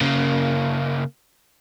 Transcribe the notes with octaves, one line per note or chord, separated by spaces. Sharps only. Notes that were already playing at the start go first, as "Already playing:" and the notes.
C#3 A#3